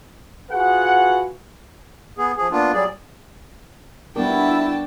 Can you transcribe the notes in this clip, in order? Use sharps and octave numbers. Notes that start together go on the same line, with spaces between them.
F4 F#4 G#4 B4 F#5
B3 G#4
F3 G#4
A#3 B3 D4 F4
F#3 G3 G#4 D5
G3 B3 D4 E4 F#4 A#4 G5 A5